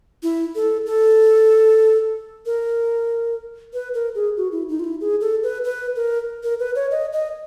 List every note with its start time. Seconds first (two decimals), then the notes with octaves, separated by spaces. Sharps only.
0.23 E4
0.55 A4
0.86 A4
2.46 A#4
3.74 B4
3.94 A#4
4.15 G#4
4.37 F#4
4.52 E4
4.69 D#4
4.80 F4
4.84 E4
5.01 G#4
5.21 A4
5.43 B4
5.64 B4
5.96 A#4
6.44 A#4
6.60 B4
6.75 C#5
6.91 D#5
7.13 D#5